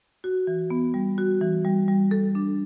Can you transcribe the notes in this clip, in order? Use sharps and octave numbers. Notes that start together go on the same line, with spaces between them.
F#4
E3
B3
G3
F#4
E3
G3
G3
A4
D4